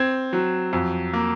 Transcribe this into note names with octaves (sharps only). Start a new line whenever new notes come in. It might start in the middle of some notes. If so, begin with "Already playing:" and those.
Already playing: C4 G#6
F#3
F2
A#3